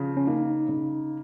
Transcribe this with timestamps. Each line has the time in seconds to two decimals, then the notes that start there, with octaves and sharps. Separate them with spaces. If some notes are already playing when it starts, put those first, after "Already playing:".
Already playing: C#3 F3 F4
0.17 C#4
0.27 A#3 D#4
0.69 C#3